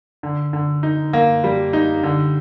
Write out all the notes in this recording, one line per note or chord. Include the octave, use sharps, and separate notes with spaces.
D3
D3
D#4
A#3
G3
D#4
D3